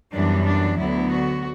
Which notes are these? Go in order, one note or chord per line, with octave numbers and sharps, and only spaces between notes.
F#2 E3 G3 B3 D4
D4
D2 D3 F#3 B3 E4
F#4